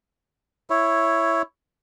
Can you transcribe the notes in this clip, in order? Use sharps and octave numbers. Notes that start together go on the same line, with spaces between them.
E4 C#5